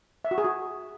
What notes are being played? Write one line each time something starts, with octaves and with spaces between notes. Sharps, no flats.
E5
F#4
G#4
F#4